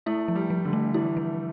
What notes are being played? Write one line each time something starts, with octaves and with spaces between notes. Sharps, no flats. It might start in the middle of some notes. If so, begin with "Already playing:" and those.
A3 E4
F3
G3
F3
D3
A3
E3 E4
F3